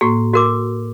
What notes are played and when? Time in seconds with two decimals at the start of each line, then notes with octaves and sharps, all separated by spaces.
0.01 A2 A#3 F#4
0.34 F#4 A#4 D6